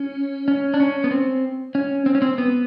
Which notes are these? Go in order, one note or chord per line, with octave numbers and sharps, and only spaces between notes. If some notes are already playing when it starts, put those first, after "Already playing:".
Already playing: C#4
C#4
D4
C#4
B3
C4
C#4
C4
C#4
C4
B3